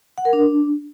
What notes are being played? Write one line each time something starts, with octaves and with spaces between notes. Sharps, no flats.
F#5
A#4
D4